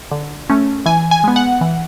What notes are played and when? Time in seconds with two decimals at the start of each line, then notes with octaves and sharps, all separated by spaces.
0.11 D3
0.50 A3 C#4
0.86 E3 G#5
1.11 G#5
1.24 G#3 B3
1.36 F#5
1.61 E3